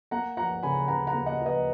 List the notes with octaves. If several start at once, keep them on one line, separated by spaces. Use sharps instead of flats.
A#3 F#5 A#5
F3 F#5 A#5
C#3 G#5 B5
C#3 F#5 A#5
F#5 A#5
A#3
D#5 F#5
F3
B4 D#5